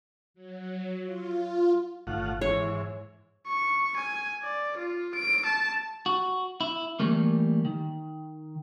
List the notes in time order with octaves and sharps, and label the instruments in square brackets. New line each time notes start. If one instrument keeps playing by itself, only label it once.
[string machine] F#3
F4
[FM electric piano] G1 D#3 [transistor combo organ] A2 F4 F#5
[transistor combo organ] G#2 E3 [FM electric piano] E4 [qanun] C#5
[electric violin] C#6
G#5
D5
F4
D7
A5
[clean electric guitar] F#4
E4
E3 G3 A3 A#3
D#3